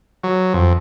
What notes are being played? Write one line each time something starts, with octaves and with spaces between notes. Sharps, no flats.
F#3
F2